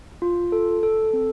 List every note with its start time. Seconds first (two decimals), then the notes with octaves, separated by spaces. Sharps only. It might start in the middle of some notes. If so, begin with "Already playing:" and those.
0.22 F4
0.52 A4
0.83 A4
1.13 C4